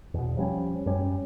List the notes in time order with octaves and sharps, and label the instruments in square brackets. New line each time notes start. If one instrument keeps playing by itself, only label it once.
[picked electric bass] E2 B2
F3 G3 C#4
F#2 G3 C#4